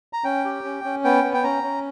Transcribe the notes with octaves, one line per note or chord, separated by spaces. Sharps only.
A#5
C#4 G5
G4
C#4
C#4
B3 G5
B3
G5
C#4 A#5
C#4